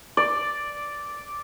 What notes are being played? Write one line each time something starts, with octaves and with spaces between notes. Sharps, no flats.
D5